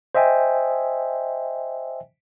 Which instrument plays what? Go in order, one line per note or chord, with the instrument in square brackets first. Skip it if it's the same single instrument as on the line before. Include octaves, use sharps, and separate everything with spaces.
[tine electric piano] C5 D#5 E5 G5 G#5